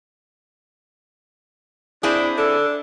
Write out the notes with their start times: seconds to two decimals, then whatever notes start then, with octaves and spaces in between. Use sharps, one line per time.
2.03 C4 D4 E4 G#4
2.37 D4 A4